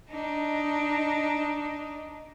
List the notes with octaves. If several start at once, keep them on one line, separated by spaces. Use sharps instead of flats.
D4 D#4